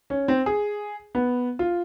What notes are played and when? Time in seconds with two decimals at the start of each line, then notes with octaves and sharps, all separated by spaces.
0.10 C#4
0.28 C4
0.46 G#4
1.15 B3
1.59 F4